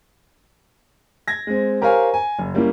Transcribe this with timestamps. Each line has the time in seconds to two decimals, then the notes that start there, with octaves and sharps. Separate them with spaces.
1.28 G#6 A#6
1.47 G#3 C4
1.81 G4 A#4 C5 C#5 F5 G#5
2.14 G#5
2.38 F#1
2.55 G3 A#3 C#4 E4